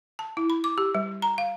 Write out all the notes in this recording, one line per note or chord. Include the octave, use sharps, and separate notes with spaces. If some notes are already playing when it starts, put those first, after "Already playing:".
A5
E4
B5
D6
G4
G3
A#5
F5